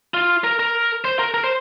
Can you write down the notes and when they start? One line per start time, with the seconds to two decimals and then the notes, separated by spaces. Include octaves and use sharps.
0.14 F4
0.44 A#4
0.59 A#4
1.05 C5
1.19 A#4
1.34 A#4
1.44 C5